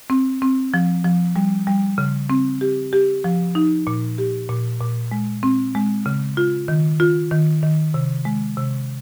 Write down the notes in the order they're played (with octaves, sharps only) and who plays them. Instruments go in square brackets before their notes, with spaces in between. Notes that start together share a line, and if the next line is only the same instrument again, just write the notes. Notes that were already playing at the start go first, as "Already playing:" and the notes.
[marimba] C4
C4
F3
F3
G3
G3
C#3
C4
G4
G4
F3
D#4
A#2
G4
A#2
A#2
G#3
C4
G#3
C#3
F4
D#3
F4
D#3
D#3
C3
G#3
C3